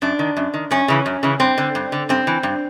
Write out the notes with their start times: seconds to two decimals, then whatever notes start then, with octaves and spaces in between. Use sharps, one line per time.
0.02 F#2 D4
0.19 D#3
0.37 F#2
0.54 D#3
0.71 F#2 C#4
0.88 C#3 E3
1.06 F#2
1.23 C#3 E3
1.40 G2 C4
1.58 D3
1.75 G2
1.92 D3
2.09 G2 C4
2.27 E3
2.43 G2